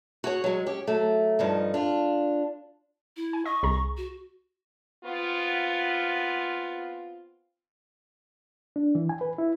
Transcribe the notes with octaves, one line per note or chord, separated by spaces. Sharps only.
F#4 G#4 C#5
F#3 G#3
C#4 G4
F#3 A3
G2 F3 D#4
D4 F4
E4
G#5
D#5 C#6
C2 G#4 A#5
F#4
B3 C4 F4
D4
E3
G#5
B4
E4